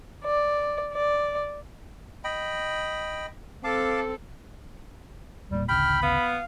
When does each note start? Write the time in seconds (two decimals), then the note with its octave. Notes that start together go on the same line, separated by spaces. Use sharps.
0.24 D5
0.92 D5
2.24 D#5 G5 B5
3.64 C4 A4 F5 A5 D6
5.51 E1 A#2 G3
5.69 A1 D2 C#3 G5 B5 F6
6.02 B3 F5